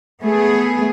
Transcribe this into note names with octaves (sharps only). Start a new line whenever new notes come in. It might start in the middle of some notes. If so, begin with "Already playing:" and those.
A3 B3 G#4